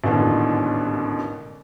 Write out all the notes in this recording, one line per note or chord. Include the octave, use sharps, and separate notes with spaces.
A1 D#2 G#2 B2 D3 E3